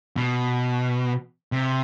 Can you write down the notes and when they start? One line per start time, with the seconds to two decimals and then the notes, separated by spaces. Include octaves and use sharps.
0.16 B2
1.52 C3